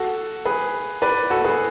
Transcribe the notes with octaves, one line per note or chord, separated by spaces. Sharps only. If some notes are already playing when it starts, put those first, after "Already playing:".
Already playing: F#4 A4
G#4 B4
B4 D5
F#4 A4
G#4 B4